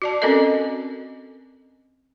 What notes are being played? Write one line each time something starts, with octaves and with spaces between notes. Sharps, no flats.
F#4 D5 A5
C4 C#4 F#4 A4 A#4 D#5